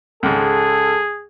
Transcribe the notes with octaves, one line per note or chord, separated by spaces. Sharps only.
C#2 G#2 G#4 A4